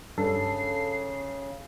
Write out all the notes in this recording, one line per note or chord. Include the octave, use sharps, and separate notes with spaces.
G2 C#3 A4 C7